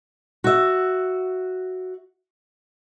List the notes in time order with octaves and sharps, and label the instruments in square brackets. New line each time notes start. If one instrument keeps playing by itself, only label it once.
[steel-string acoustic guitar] F#4 E5